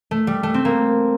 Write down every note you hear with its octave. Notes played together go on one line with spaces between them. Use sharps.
A3
G3
A3
C4
A#3